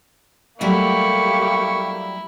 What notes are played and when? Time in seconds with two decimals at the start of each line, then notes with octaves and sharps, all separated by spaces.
0.61 F#3 G3 A3 A#3 E4 G4 C#6